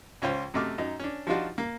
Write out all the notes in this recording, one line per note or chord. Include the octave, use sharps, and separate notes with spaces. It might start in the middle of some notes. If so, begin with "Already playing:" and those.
C#2 C#4 F4 C5
F#2 C3 A3 D#5 D6 F6
F#2 D#4
C#4 D4
F3 G3 D4 D#4 F4 F#4
A#3